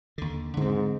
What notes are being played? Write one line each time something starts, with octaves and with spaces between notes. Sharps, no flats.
D#2 D3
G#2 D3 C4